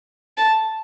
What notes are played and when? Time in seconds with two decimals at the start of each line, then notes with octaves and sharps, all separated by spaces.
0.37 A5